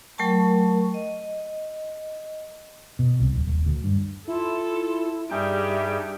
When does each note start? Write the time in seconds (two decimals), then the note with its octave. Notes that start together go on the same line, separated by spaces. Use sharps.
0.18 F#3 A3 A#4 G5 A5 C#6
0.94 D#5
2.99 B2
3.20 C2
3.35 D1
3.47 D#1
3.66 D2
3.84 G2
4.28 E4 F4 A4
5.30 G2 G3 D#4 G#4 E5 G5